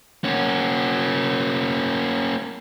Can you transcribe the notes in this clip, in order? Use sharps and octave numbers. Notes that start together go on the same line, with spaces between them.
A#3 C#4